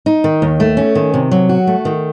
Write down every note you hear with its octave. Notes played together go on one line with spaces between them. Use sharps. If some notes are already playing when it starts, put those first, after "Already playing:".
D#4
D#3
D#2
A3
C#4
D#3
C3
F#3
F#4
A3
D#3